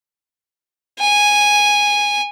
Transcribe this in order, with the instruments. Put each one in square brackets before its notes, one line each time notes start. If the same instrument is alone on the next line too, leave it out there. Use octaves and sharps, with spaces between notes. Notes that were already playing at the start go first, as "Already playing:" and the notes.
[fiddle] G#5